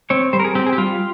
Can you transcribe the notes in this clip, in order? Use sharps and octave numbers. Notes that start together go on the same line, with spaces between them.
C4 C#5
G3 C5
A#4
G#4
C4 G4
G#4
G4
G3 F4